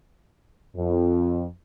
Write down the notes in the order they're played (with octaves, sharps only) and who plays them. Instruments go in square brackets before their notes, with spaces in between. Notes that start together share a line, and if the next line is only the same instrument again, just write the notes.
[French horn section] F2